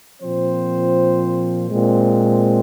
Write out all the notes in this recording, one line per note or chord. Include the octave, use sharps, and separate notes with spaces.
A#2 F3 C4 C5
A#2 G#3 C4